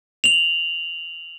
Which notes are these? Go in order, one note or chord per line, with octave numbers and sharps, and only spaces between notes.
F7 F#7